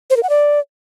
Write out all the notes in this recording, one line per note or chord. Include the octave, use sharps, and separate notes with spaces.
C5
A#4
F#5
D5